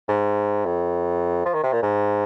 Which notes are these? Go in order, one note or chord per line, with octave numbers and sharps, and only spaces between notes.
G#2
F2
F3
D#3
C3
A#2
G#2